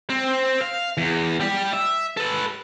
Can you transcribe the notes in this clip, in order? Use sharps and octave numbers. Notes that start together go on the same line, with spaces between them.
C4
F5
E2
G3 G4
E5
A4 B4